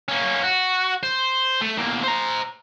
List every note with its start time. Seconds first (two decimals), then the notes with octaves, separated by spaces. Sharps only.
0.08 A#3 C#4
0.43 F#4
1.03 C5
1.62 A3
1.78 E2 A#3
2.04 C5 A#5